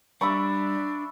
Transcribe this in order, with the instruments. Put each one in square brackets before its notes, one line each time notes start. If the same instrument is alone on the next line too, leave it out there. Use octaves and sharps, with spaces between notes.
[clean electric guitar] G3 [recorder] D4 [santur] E5 B5 C#6